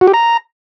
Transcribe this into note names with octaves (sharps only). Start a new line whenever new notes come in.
F#4
G4
A#5